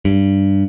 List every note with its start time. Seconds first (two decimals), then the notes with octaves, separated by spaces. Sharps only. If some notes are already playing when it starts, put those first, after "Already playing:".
0.05 G2